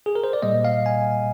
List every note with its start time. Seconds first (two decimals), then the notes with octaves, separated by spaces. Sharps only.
0.06 G#4
0.15 A#4
0.24 C5
0.33 D5
0.42 A#2 G3 A#3 D#5
0.65 F5
0.86 G#5